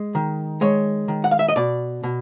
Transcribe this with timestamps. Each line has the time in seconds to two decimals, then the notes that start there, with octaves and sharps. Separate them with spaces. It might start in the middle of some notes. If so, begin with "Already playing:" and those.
Already playing: G#3
0.15 D#3
0.61 G#3 C#5
1.08 D#3
1.24 F#5
1.31 F5
1.39 E5
1.49 D#5
1.56 B2 D5
2.03 B2